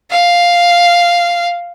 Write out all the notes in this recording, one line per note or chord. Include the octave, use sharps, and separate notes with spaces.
F5